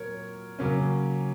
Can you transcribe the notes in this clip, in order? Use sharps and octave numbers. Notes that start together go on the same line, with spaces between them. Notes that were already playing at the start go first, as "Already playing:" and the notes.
Already playing: A#2 F#3 A#4 C#5
C#3 F#3 A#3 C#4